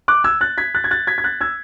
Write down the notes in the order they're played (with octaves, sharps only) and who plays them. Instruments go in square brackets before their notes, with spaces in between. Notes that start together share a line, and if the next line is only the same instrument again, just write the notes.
[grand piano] D6 F#6
E6 G#6
F#6 A6
G#6 B6
F#6 A6
G#6
F#6 A6
G#6 B6
G#6
F#6 A6
E6 G#6